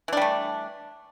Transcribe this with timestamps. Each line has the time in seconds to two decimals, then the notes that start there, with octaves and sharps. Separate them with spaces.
0.08 E3
0.13 D4
0.17 G3
0.22 A3